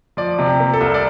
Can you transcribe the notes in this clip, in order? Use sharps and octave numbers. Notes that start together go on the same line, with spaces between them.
F3 D5
C3
G4
A#3
A4
C2
D5